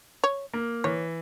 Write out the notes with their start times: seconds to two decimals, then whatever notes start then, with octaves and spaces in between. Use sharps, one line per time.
0.24 C#5
0.54 A#3
0.84 E3 C#5